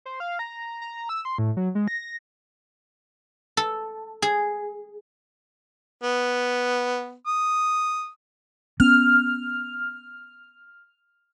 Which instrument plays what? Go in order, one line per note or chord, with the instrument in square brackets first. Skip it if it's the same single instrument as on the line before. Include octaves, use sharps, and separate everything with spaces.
[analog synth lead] C5
F5
A#5
A#5
E6
C6
A2
F#3
G#3
A#6
[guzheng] A4
G#4
[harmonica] B3
D#6
[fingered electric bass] B3 C#4 [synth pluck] F6